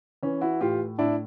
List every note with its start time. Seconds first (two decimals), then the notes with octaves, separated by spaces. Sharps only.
0.23 E3 C#4
0.41 E4 F#4
0.61 A2 F4 G4
0.98 A2 D4 E4